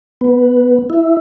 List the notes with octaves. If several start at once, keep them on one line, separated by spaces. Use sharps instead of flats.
B3
E4